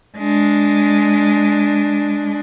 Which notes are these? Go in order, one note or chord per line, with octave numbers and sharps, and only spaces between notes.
G#3 D4